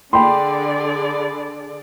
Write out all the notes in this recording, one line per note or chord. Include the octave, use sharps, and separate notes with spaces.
D3 G#4 D5 G5 B5 C6